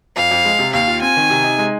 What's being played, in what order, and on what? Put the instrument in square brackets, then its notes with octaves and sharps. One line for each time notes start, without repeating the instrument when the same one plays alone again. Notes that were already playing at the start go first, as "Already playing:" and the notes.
[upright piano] F2 [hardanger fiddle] F5
[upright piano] F2
G#3
C3
[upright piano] D#2 [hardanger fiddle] F5
[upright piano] F4
[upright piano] C4 [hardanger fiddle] G#5
[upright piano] D#3
C3
D#4
G#3